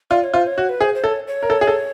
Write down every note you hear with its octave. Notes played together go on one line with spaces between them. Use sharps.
F4 D5
C#5
F4 C5
C#5
F#4
B4
G#4 C5
C5
A4 C#5
C#5
A#4
A4
G#4
A4